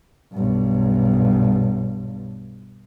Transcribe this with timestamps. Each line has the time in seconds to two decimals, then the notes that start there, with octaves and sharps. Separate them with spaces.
0.33 B1 G2